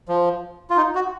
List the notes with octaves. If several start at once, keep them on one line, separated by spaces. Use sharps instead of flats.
F3
F4
D#4
F#4